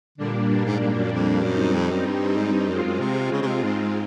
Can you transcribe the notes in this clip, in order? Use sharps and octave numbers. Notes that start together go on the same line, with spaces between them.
A#2 D3 G3 A#3 D4
G2
G#2
G#2
F#2
F2
F#2 G3 C4 D#4
F2
F#2
G2
G#2
G2
F#2 G#3 C4 F4
F#2
C3
C#3
C#3
C3
G#2